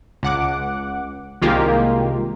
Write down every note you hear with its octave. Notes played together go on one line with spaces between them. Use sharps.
C#2 F#5 D6
C2 D#3 G#3 A#3 F4 G4